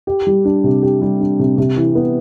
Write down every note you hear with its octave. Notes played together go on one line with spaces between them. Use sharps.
G4
G3
D4
C3
G4
G3
D4
C3
C3
E3
B3